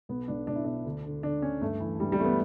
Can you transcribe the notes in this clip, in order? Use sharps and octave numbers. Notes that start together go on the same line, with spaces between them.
B1 B3
B1 D4
B1 D4
E4
B2 D4
D2
D3
D3 D4
D2 C#4
G2 A3
E3
G2 G3
G3
E3 A3
B3